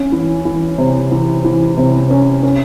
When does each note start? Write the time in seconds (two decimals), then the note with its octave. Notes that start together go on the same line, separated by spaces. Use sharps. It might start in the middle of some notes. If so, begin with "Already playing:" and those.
Already playing: C#4
0.12 E3
0.45 E3
0.78 C3
1.11 E3
1.44 E3
1.77 C3
2.10 C#4
2.43 C#4